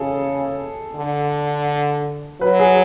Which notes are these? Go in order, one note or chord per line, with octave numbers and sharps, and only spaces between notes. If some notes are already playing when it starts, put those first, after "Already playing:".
Already playing: C#3 G#4 A4
D3
F#3 B4
G#4